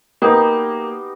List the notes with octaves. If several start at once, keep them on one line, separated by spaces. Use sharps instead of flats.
A#3 B3 D#4 G4